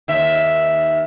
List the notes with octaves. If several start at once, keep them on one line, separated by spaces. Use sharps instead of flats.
D#2 E5